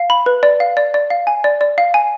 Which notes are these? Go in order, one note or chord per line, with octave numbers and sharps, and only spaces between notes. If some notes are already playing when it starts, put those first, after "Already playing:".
Already playing: F5
B5
B4
D5
F5
D5
D5
F5
G#5
D5
D5
F5
G#5